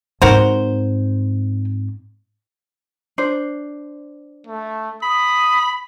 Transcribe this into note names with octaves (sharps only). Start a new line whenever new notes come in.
G#2 C4 F#4 A#4 C5
D4 C5
A3
B5 D#6